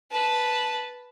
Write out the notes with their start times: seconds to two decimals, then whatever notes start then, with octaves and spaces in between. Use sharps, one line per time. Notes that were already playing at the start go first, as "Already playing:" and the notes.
0.11 B4 A5